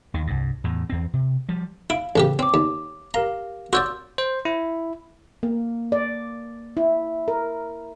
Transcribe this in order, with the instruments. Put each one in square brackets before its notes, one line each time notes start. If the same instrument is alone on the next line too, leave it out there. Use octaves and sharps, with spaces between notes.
[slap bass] D#2 D#3
C2 G2
E2 A2
E2 C4
C3
F3 G3
[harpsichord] E4 [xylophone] F5 D7
[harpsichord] A1 C#3 G4
[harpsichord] C4 [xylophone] C#5 D6
[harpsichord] D#2
[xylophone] G4 A#4 F5 [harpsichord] A#5
[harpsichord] F#4 C#5 D5 [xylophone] C6 E6 G6
[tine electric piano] C5
E4
[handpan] A#3
D5
E4
A#4